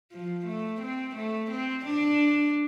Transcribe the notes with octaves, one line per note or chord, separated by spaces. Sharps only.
F3
A3
C4
A3
C4
D4